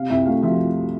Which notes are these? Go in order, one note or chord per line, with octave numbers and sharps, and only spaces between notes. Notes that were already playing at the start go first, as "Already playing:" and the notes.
Already playing: C3 F5
C2 E5
A3 F5
F3 E5